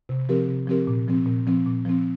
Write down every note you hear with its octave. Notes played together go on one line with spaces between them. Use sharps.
C3
F3 C4 G4 A#4
C3
F3 C4 G4 A#4
A#2
F3 C4
A#2
F3 C4
A#2
F3 C4